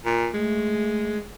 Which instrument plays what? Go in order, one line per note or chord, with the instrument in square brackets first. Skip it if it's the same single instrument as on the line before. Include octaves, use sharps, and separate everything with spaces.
[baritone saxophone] A#2
[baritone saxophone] G#3 [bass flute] A3